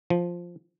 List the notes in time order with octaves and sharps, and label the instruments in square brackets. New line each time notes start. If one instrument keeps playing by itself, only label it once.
[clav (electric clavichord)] F3